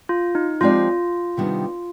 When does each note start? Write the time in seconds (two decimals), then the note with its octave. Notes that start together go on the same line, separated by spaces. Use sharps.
0.09 F4
0.35 D#4
0.61 F3 G#3 C4 F4 G4 D5
1.37 C3 D#3 G3 B3 D4